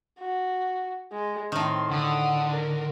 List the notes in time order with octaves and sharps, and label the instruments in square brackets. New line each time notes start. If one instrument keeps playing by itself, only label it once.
[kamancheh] F#4
G#3
[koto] A2 D#3 [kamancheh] C4 C6
[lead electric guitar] D3 [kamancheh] F#5 D#6
[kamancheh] A#4